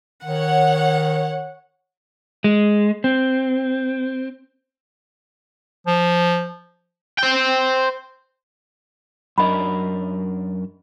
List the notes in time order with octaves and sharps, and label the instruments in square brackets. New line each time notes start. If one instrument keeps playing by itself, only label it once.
[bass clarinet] D#3 [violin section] C#5 F#5
[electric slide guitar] G#3
C4
[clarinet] F3
[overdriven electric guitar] C5 G5
[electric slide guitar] F#2 D4 A#4 [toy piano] D5 D#5 B5